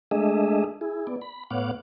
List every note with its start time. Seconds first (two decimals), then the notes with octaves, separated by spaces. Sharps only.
0.11 G#3 A3 D4 G#4 D#5 E5
0.81 E4 G#4
1.07 B3 D5
1.22 B5
1.51 A2 B3 C#5 F5 F#5 D6